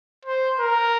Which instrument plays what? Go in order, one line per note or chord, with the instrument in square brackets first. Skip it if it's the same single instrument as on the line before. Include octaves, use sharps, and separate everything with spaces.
[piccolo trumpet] C5
A#4